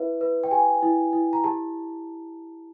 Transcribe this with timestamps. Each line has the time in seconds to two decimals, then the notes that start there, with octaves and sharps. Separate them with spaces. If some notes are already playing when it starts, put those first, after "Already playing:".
Already playing: E4 B4 E5
0.21 B4
0.43 G5
0.51 G4 G#5
0.83 E4
1.13 E4
1.33 A#5
1.44 G4 A5